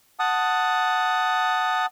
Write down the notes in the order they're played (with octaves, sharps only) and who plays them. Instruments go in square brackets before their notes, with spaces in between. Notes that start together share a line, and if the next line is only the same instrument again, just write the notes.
[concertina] F#5 A5 D#6